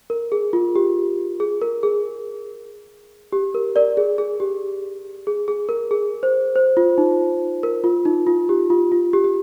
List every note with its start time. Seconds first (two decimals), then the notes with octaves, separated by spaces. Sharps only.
0.10 A#4
0.32 G#4
0.53 F4
0.76 G4
1.40 G#4
1.62 A#4
1.83 G#4
3.32 G4
3.55 A#4
3.76 A#4 D5
3.97 G#4
4.18 G#4
4.40 G4
5.27 G#4
5.48 G#4
5.69 A#4
5.91 G#4
6.23 C5
6.56 C5
6.77 F4
6.98 D#4
7.63 A#4
7.84 F4
8.05 D#4
8.27 F4
8.49 G4
8.70 F4
8.92 F4
9.13 G4
9.24 G4